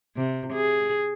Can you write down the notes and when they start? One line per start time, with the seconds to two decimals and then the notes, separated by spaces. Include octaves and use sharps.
0.17 C3
0.53 G#4